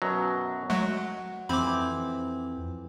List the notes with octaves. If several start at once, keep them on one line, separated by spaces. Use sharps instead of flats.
F#2 B2 F#3
F#3 G#3 A3 F#4
F2 E3 C4 B5 D6